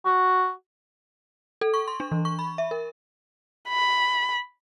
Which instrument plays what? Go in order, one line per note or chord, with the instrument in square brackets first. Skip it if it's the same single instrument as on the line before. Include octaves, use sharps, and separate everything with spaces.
[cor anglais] F#4
[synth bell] A4
C#6
C6
D4
E3
C#6
B5
E5
A#4
[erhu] B5